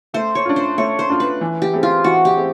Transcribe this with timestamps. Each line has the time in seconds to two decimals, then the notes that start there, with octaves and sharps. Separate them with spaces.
0.14 A3 C5
0.35 C#5
0.45 D4 F4
0.56 C5
0.78 A3 C#5
0.99 C5
1.10 D4 F4
1.20 B4
1.41 E3
1.62 G4
1.73 A3 C4 E4 G#4
1.83 F4
2.04 E3 F#4
2.25 G4
2.36 C4 E4 G#4